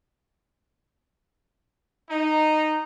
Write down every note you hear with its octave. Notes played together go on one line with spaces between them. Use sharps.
D#4